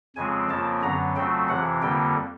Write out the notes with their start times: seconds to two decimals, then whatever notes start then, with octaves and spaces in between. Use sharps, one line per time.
0.16 F2 C#3 F3 G#3 C4 G#5
0.49 F2 C#3 F3 A#3 A5
0.82 F#2 D3 F#3 B3 A#5
1.16 F2 C#3 F#3 A3 C4 G5
1.49 F2 C3 E3 F#5
1.82 F2 D3 G3 A#3 G5